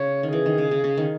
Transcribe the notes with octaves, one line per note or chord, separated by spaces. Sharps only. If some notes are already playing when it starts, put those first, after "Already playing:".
Already playing: C#3 C#5
D#3
E3 G#4
D#3
C#3
C#3
C#3
D#3